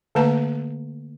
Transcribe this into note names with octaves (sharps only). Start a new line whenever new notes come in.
D3 A3 A#3 B4 A5 A#5